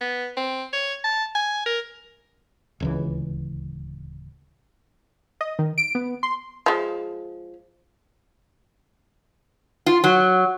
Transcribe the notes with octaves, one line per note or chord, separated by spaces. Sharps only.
B3
C4
C#5
A5
G#5
A#4
D1 C#2 E3
D#5
D#3
D7
B3
C6
F3 G#3
F4
F#3